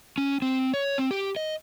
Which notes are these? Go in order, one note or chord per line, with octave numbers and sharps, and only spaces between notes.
C#4
C4
C#5
C4
G4
D#5